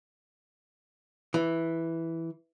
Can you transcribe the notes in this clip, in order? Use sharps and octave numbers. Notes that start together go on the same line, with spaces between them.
E3